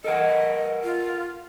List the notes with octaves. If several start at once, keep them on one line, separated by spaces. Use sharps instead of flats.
A4 A#4 D#5 F#5
F4